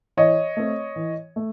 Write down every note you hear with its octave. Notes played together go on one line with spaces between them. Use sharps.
E3 C#5 D#5
A3 C4
E3
A3